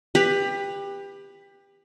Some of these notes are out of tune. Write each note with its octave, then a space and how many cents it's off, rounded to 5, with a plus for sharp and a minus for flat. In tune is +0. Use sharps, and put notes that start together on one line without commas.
G4 +25 B4 +0